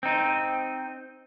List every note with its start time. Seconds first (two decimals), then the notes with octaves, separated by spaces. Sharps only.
0.03 C4 D#4